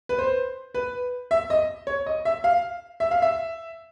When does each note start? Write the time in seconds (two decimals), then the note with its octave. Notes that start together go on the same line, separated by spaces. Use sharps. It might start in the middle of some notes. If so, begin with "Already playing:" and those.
0.09 B4
0.18 C5
0.75 B4
1.31 E5
1.50 D#5
1.87 C#5
2.06 D#5
2.25 E5
2.44 F5
3.00 E5
3.11 F5
3.22 E5